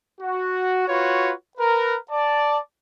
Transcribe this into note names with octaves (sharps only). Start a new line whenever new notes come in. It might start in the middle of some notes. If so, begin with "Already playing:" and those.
F#4
F4 F#4 B4 C#5
A#4 B4
D5 A5